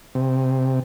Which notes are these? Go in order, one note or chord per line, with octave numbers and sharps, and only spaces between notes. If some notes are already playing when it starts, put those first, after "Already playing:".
C3